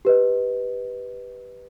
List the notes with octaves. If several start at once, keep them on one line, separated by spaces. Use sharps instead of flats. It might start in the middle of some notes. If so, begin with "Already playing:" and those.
G4 B4 D#5